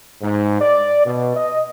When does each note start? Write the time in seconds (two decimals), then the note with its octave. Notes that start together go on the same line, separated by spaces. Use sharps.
0.22 G#2
0.61 D5
1.05 B2
1.36 D#5